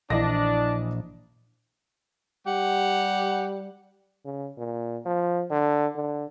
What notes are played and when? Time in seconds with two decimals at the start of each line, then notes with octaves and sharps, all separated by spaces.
0.10 A#1 E3 D4 D#5 A#6
2.47 G3 G4 F#5
4.25 C#3
4.58 A#2
5.06 F3
5.51 D3
5.96 D3